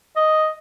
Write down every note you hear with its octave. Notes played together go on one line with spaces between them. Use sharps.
D#5